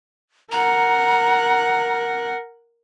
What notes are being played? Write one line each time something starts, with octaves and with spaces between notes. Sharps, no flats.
A#4 F#5 A#5